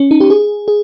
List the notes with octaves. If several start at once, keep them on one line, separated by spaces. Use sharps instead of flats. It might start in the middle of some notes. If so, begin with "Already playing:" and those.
Already playing: C#4
D#4
G4
G#4
G#4